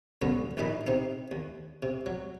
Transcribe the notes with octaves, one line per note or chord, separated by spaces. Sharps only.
B1 G2 D3 B3 C#4
A#1 D#2 A#2 D#4 D#5 B5
C3 C4 D#4
D#2
C3
F#3